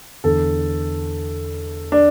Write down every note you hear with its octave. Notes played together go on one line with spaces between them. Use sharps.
E2 D3 A4
D4